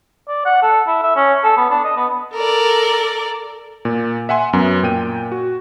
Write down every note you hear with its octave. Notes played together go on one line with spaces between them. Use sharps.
D5
F#5
A4
E4
E5
C#4
A4
B3
D4
D#5
B3
A4 A#4 D5
A#2
E5 F#5 G#5 C6
F#2 F#3 B3
A#2 G5 D#7
F#4